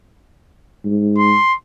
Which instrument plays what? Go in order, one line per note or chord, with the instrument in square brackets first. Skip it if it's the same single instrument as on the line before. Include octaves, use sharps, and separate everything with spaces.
[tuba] G#2
[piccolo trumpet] C6